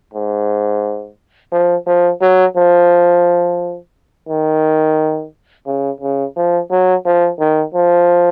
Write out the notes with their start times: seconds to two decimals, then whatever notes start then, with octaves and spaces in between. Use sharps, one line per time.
0.14 G#2
1.52 F3
1.87 F3
2.21 F#3
2.56 F3
4.29 D#3
5.66 C#3
6.01 C#3
6.36 F3
6.71 F#3
7.06 F3
7.39 D#3
7.74 F3